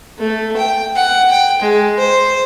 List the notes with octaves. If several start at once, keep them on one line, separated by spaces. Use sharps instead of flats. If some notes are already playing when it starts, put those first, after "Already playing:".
A3
G5
F#5
G5
G#3
C5